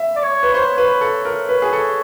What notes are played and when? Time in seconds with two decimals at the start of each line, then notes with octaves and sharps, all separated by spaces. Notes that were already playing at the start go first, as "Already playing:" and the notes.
Already playing: E5
0.16 D5
0.23 C#5
0.43 B4
0.54 C5 C#5
0.78 B4
1.01 A4
1.25 A#4
1.49 B4
1.62 G#4
1.73 A4